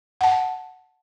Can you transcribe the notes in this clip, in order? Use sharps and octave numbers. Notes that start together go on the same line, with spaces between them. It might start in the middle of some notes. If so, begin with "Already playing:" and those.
F#5 A5